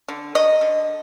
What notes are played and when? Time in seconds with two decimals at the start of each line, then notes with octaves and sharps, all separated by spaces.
0.08 D3
0.35 F#3 D#5
0.61 D3